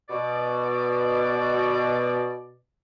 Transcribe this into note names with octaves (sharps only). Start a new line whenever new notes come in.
B2 D5